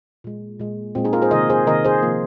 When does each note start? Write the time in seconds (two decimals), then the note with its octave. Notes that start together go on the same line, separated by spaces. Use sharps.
0.24 A#2 G#3
0.59 A#2 G#3
0.95 A#2 C4
0.98 G#3
1.04 D#4 G#4
1.13 F4 A#4
1.22 G#4 C5
1.31 C3 D#3 A#3 A#4 D#5
1.50 G#4 C5
1.67 C3 D#3 A#3 A#4 D#5
1.85 G#4 C5
2.02 C3 F3 A#3